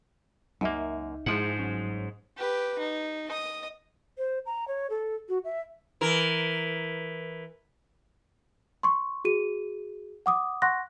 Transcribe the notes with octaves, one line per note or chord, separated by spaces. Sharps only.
C#2 F#2 A#3 D#4 E5
G#2 F3 G#3 E4 G#4 F#5
G1 F#3 C#4
G4 B4
D#4
D#5 D#6
C5
A#5
C#5
A4
F#4
E5
E3 A#4
C6 C#6
F#4 G#4 D#7
F#5 D6 D#6
F#5 C6 C#6 F#6 A#6